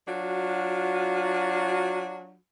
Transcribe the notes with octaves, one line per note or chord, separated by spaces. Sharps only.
F#3 D4 F4 F#4